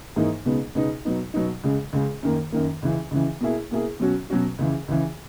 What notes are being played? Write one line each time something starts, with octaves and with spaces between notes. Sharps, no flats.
G#2 E3 A#3 D#4
C#2 B2 G#3 B3 D#4
C#2 B2 G#3 B3 D#4
B2 F#3 B3 D#4
B2 F#3 B3 D#4
C#2 C#3 G#3
C#2 C#3 G#3
F#2 D#3 A#3
F#2 D#3 A#3
C#2 C#3 E3
C#2 C#3 E3
B2 A#3 E4 G#4
B2 A#3 E4 G#4
B2 F#3 C#4 F#4
B2 F#3 C#4 F#4
C#2 C#3 E3
C#2 C#3 E3